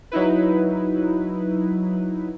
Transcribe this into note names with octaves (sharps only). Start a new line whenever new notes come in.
F#3 D#4 E4 B4